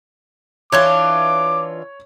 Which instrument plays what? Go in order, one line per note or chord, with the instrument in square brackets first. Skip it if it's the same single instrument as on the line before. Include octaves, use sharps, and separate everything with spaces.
[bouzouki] E3 D4 F4 [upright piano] C#5 G#6 [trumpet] D6